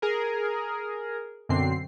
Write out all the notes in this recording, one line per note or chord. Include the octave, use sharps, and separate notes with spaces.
G#4 A#4
F#2 B2 D3 C4 C7